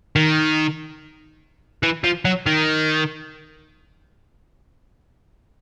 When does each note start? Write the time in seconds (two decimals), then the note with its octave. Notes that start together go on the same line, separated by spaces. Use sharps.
0.16 D#3
1.83 E3
2.04 F3
2.25 F#3
2.46 D#3